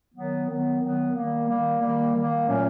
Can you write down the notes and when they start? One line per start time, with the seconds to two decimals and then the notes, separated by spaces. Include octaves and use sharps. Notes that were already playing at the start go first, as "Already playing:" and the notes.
0.15 D#3 F#3 B3
0.47 D#3 F#3 B3
0.81 D#3 F#3 B3
1.14 D#3 G3 A#3
1.48 D#3 G3 A#3
1.80 D#3 G3 A#3
2.14 D#3 G3 A#3
2.47 A#2 F#3 A3 C#4